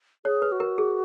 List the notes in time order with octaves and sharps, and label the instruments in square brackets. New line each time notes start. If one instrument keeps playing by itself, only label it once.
[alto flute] G#4 [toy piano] C#5
[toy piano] B4
[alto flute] F#4
[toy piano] A#4
G#4